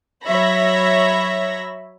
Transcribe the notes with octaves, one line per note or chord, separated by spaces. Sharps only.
F#3 C#5 E5 B5 A#6